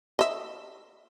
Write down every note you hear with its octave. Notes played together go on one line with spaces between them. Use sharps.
D#5 E5